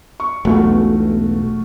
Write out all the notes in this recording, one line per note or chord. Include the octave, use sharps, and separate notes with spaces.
C#6
E1 B1 A3 F4 F#4